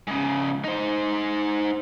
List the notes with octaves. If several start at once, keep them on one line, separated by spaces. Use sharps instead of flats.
G#2 C#3
D#4 C5